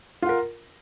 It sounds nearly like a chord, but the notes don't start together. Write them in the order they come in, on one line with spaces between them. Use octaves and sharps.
F4 F#5 A#4